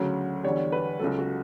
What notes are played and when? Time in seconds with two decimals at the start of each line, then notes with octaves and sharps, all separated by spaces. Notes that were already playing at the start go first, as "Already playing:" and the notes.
Already playing: D2 C#3 F#3
0.44 E2 D3 G3 C#5
0.72 B4
0.99 C#2 C#3 F#3 A4
1.18 F#4